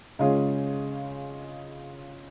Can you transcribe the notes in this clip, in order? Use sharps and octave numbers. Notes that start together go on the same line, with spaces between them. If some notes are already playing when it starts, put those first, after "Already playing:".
C#3 G#3 C#4 F4 G#4